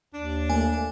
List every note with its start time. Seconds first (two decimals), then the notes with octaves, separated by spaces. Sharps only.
0.14 D#2 D4
0.50 A3 A#3 G#5